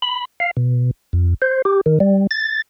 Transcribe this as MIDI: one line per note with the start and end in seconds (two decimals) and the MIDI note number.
0.02 0.25 83
0.40 0.51 77
0.57 0.91 47
1.13 1.34 41
1.42 1.62 72
1.65 1.81 67
1.86 1.99 51
2.00 2.27 55
2.31 2.62 93